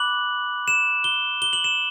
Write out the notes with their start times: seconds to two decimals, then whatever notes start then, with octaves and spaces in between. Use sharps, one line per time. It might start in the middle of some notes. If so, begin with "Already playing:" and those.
Already playing: B5 D6 F#6 F#7
0.68 E7
1.04 G7
1.42 G7
1.53 F#7
1.64 E7